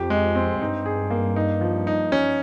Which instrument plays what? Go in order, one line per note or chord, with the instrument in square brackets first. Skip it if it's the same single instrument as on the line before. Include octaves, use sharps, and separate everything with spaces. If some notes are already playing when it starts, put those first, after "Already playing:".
Already playing: [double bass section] F2 [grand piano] G4
[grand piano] G#3
C4
[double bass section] G2 [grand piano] D#4
[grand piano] G#4
A#3
D#4
F3
D#4
C#4